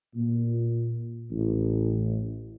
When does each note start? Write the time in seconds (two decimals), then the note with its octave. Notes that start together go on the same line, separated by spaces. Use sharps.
0.16 A#2
1.32 A1